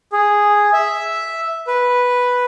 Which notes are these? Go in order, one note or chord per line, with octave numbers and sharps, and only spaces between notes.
G#4
E5
B4